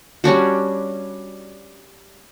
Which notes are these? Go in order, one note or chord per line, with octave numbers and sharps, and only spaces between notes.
G3 C#4 D4 F#4